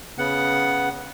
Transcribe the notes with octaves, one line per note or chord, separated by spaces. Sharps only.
C#3 B3 F#5